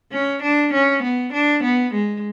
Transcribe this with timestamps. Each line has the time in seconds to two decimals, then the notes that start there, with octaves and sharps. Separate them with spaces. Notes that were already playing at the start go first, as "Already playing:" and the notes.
0.12 C#4
0.42 D4
0.74 C#4
1.03 B3
1.33 D4
1.63 B3
1.94 G#3